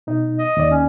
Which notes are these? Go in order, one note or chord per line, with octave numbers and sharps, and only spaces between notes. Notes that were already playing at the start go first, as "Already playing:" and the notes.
B2 D#4
D#5
D#2 D5
C#4